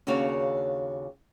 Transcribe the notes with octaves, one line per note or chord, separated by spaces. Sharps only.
D#2 C#3 D4 F#4 C#5 F5